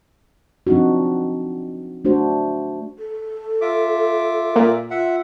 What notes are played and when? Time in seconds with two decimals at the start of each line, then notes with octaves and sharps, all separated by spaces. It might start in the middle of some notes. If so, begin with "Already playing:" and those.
0.67 F3 C4 D4 D#4 F#4
2.05 A3 D4 F#4 C5
2.99 A4
3.61 F4 E5 D6
4.56 A#2
4.91 F4 E5 F#5